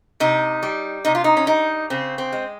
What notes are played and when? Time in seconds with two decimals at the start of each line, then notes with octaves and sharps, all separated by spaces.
0.20 C3 D#4
0.63 G3
1.05 C3 D#4
1.15 F4
1.24 D#4
1.37 C#4
1.47 G3 D#4
1.90 C#3 C4
2.18 C4
2.32 G#3